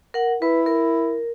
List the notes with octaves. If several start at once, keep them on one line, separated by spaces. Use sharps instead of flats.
A#4 F#5
E4 B4
A#4